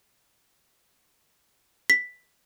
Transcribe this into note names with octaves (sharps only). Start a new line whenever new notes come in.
B6